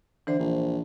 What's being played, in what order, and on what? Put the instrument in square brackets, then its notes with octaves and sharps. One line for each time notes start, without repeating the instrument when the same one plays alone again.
[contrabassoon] D3 [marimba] E3 C5
[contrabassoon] A#1